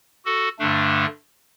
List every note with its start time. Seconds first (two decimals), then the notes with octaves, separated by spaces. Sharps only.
0.25 F#4 A4
0.59 G2 D3 A3 D4